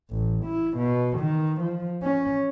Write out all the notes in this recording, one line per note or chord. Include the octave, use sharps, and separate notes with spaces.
A1
E4
B2
D#3
F3
C#4